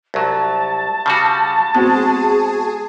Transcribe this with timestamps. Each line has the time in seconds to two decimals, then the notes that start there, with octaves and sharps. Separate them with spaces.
0.14 C2 F#3 A5
1.06 C#3 G3 F#4
1.75 G#3 B3 C4 F#4 G#4